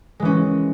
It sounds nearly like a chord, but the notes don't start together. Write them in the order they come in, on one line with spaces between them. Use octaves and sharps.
G#3 E3 C#4